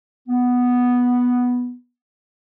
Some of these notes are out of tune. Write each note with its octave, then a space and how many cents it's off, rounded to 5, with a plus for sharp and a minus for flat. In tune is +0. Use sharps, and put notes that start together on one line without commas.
B3 -5